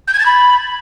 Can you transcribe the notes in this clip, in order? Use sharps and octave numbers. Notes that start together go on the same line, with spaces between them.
G6
G#6
A6
B5